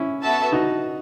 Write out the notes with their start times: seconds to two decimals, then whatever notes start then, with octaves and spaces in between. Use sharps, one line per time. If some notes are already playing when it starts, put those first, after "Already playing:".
Already playing: C#4 E4
0.23 B3 F#4 A4 E5 A5
0.52 D#4 F#4